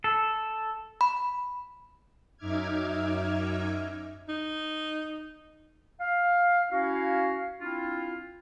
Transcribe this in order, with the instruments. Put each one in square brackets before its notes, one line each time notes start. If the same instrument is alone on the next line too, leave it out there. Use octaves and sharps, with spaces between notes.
[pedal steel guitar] A4
[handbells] B5
[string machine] F#2 D#4 E5 D6 F6 G#6
[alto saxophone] D#4
[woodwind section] F5
C#4 E4 F#4 F5
C4 D4 E4 F4